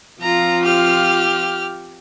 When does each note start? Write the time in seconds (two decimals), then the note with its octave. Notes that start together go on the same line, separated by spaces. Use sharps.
0.21 F3 C4 F4 A#5
0.62 G4 F6